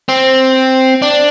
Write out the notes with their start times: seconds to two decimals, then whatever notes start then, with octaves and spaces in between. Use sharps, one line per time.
0.09 C4
1.02 D4